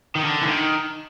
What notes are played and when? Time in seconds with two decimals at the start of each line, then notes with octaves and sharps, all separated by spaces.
0.16 D#3
0.23 D3
0.43 E3
0.47 D#3